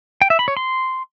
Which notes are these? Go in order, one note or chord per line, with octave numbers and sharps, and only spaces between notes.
G5
E5
B5
C#5
C6